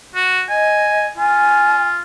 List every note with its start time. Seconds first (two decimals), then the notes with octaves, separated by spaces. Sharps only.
0.15 F#4
0.49 D#5 G#5
1.18 F4 G#5